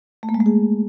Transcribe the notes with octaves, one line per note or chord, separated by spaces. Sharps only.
A3
A#3
G#3
A3
G#4